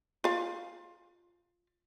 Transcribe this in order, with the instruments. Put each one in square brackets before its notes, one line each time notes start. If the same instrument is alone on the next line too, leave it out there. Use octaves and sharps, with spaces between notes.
[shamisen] F4 F5